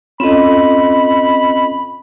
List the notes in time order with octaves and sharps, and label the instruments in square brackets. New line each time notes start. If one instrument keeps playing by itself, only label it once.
[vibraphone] C4 D#5 [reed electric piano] C#4 F4 A4 [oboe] B5